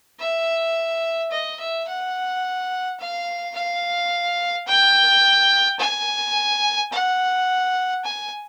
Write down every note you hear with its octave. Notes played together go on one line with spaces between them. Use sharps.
E5
D#5
E5
F#5
F5
F5
G5
G#5
F#5
G#5